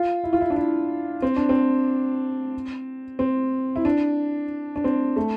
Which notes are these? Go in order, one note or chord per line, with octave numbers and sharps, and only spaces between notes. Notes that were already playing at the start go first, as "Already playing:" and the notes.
Already playing: F4
E4
F4
E4
D4
E4
C4
D4
C4
C4
E4
D4
D4
C4
A3